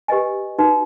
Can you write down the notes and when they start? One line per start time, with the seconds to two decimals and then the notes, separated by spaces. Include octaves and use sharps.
0.08 G4 B4 D#5 G#5
0.59 D#4 F#4 B4